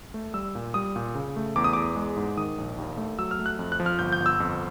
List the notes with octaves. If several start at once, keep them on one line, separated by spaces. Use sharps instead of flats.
A3
G3 E6
A#2
G3 D#6
A#2
C#3
A3
E2 D6
D#6
E2 D6
G#3
G#2
D#3 D#6
A#1
D#2
A3
F#3 E6
F6
A3
F#6
F2
F#6
F3
F6
G1 G6
G6
G1
E6
F2